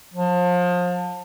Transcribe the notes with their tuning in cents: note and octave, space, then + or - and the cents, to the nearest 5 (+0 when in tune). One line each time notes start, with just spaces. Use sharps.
F3 +30